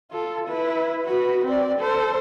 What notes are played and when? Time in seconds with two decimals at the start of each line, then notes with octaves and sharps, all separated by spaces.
0.12 F4 A4
0.48 E4 B4
1.05 F#4 B4
1.46 C4 D5
1.79 A4 C5